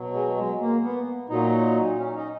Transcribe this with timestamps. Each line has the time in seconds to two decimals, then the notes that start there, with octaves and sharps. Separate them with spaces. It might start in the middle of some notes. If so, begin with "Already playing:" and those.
Already playing: B2 F#3
0.13 G#3
0.37 G#3
0.61 A#3
0.83 B3
1.29 A#2 F#3 D#4
1.99 C#4
2.16 D#4